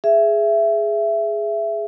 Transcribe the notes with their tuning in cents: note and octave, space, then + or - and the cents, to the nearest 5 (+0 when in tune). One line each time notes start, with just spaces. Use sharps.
G#4 +5 E5 +15